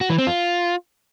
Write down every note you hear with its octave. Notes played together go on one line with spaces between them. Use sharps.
F#4
E3
C4
F4